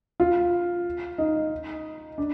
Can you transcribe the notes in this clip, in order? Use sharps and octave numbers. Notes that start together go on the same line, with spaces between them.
F4
D#4
D4